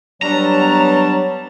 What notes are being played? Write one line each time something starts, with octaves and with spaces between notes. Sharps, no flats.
F#3 G3 B3 D4 C#5 A5 A#5